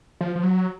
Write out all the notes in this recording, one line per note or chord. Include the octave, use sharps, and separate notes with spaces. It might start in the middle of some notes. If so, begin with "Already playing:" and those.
F3
F3
F#3